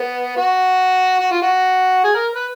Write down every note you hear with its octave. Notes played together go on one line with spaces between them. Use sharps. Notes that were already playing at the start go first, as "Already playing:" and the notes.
Already playing: B3
F#4
F#4
F4
F#4
G#4
A#4
B4